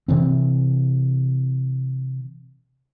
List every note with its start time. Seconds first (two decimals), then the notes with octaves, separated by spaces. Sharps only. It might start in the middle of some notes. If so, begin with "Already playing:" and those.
0.08 C3 E3 C4